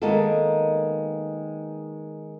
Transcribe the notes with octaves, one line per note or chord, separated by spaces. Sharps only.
D#3 G#3 A#3 B3 F#4 A4